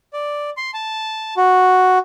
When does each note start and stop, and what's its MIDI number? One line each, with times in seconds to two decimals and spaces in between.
0.13 0.50 74
0.57 0.71 84
0.74 1.34 81
1.37 1.98 66